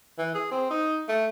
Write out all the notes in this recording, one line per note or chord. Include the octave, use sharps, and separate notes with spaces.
E3
G#4
C4
D#4
A3